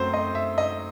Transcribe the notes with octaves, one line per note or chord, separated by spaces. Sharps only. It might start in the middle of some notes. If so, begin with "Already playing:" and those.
Already playing: F#2 F#3 A3 C4 C5
D#5
E5
D#5